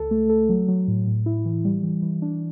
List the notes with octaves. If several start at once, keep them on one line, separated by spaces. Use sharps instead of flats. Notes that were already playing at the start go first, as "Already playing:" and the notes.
Already playing: C#2 A4
A3
A4
F#3
F#3
A2
A2
E4
E3
G3
E3
E3
D4